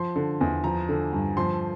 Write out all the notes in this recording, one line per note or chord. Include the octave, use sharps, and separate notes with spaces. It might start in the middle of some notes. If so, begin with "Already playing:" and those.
Already playing: F3 C6
D3
E2
F3 A#5
D3
G2
F3 C6